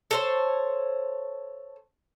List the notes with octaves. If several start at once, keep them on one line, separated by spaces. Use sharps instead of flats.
A4 C5 C#5